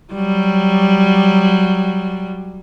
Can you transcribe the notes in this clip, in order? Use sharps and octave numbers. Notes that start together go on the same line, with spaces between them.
F#3 G3